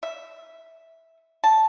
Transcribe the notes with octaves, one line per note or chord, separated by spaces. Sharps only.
E5
A5